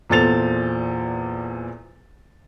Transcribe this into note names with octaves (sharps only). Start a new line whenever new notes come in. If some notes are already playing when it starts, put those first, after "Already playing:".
E2 A#2 A4 C5 A6 F7